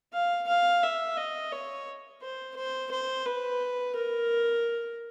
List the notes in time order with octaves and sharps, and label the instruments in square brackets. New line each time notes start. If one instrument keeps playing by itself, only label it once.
[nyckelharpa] F5
F5
E5
D#5
C#5
C5
C5
C5
B4
A#4